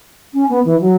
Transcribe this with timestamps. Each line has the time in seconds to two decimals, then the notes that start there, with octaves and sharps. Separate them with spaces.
0.34 C#4
0.49 B3
0.65 E3
0.80 F#3